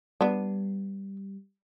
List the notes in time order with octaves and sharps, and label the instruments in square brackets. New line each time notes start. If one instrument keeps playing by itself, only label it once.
[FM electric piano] G3 [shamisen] B3 D4